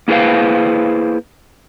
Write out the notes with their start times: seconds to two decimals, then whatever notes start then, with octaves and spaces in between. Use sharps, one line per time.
0.08 A#3 E4 G#4 B4 C5 F5